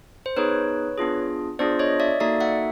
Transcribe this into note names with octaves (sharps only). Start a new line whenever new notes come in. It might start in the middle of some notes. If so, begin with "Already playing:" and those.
C5
B3 D#4 G#4 B4 C#5
B3 D4 F4 G#4
B3 D4 F4 G#4 C5 D5
C#5 D#5
D5 E5
A#3 D#4 F#4 A4 D5 E5
E5 F#5